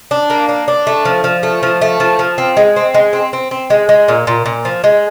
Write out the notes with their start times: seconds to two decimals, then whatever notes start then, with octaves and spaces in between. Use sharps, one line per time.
0.11 D4
0.30 A#3
0.49 D4
0.68 D4
0.87 A3
1.05 F3
1.24 F3
1.43 A3
1.63 F3
1.81 A3
2.00 F3
2.19 F3
2.38 C4
2.57 G#3
2.76 C4
2.94 G#3
3.13 C4
3.33 C4
3.51 C4
3.70 G#3
3.89 G#3
4.08 A#2
4.27 A#2
4.46 A#2
4.65 F3
4.84 G#3